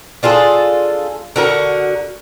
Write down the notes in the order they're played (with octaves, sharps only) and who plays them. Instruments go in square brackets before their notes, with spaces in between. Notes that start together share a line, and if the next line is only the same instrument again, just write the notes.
[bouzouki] D4 F4 G#4 A4
D3 F#4 A#4